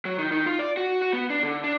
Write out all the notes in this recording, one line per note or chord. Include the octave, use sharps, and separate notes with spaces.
F#3
D#3
D#3
F4
D5
F#4
F#4
B3
D4
D3
D4